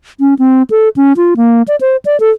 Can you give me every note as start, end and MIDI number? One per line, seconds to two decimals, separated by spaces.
0.20 0.34 61
0.39 0.63 60
0.70 0.89 69
0.96 1.13 61
1.17 1.34 65
1.37 1.62 58
1.68 1.76 74
1.81 1.97 72
2.05 2.19 74
2.20 2.30 69